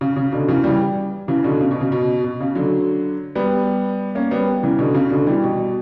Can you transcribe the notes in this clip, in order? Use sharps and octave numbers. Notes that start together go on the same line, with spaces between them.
C#3
C#3
B2 D3
C#3 E3
E3 G3
C#3 E3
B2 D3
C#3
B2
C#3
B2
B2
C#3
D3 F#3
G3 B3
A#3 C#4
G3 B3
C#3 E3
B2 D3
C#3
B2 D3
E3 G3
B2